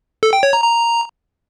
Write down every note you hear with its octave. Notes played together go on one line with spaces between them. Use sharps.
A4
G5
C#5
A#5
A#5